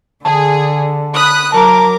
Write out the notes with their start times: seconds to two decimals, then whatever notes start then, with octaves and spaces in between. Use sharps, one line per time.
0.25 D3 G#4 A5
1.14 B5 D#6 F#6
1.52 F#3 A#4 A5 A#5 D6